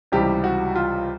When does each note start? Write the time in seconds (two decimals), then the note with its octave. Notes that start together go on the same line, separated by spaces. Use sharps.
0.12 C#2 C3 E3 G3 G4
0.44 F#4
0.76 F4